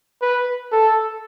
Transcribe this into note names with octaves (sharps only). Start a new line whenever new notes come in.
B4
A4